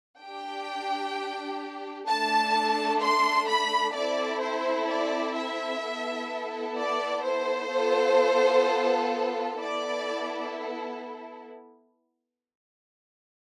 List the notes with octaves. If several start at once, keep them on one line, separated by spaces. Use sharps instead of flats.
D4 G4 G5
A3 D4 A4 A5
C6
B5
C4 E4 A4 D5
C5
D5
E5
B3 E4 A4
D5
C5
B3 F4 A4
B3 E4 A4 D5